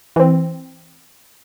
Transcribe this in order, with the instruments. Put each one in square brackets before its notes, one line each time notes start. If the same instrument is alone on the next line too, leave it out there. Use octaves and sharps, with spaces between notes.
[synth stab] E3 C4